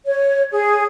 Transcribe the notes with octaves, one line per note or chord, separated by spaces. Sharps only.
C#5
G#4